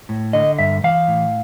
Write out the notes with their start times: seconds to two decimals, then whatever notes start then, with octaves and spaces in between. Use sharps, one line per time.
0.09 A2
0.33 D3 D#5
0.59 G2 E5
0.84 E3 F5
1.08 A2